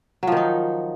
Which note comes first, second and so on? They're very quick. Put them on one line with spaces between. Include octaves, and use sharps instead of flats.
F#3 F3 D#3 D#4